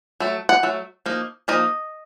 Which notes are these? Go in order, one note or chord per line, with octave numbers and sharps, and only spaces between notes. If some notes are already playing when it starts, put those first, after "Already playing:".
F#3 A3
F#5
F#3 A3
F3 A#3 D#4
F3 A#3 D#4 D#5